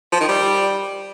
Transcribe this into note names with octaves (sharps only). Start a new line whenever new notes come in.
F3
D#3
G3